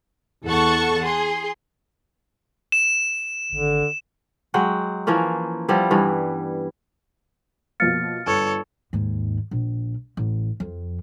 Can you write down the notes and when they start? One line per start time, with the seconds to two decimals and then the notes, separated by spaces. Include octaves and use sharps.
0.46 E2 A4 F#5 A5 C#6
1.03 G#4 C6
2.72 E7
3.52 G#1 D3
4.54 F#3 G#3 F#5 G5
5.07 E3 F3 A#3 C#4
5.68 F3 G3 B3 E4
5.91 G2 E3
7.80 B2 F3 A#3 F6 A6 C#7
8.27 G1 A4 C#5
8.93 D#2 G#2
9.51 A#1
10.17 A1
10.60 F2